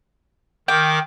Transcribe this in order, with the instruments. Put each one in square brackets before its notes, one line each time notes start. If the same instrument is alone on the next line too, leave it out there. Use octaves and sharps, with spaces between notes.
[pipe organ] D#3 A#4 D6 [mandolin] G5